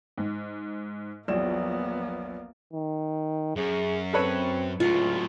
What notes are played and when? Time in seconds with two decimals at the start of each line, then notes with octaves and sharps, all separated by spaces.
0.18 G#2
1.28 A#1 E2 F#3 A#3 B3 D5 E7
2.73 D#3
3.56 F#2 G#4
4.13 C4 A4 B4 C#5
4.80 C#2 A2 F#3 F4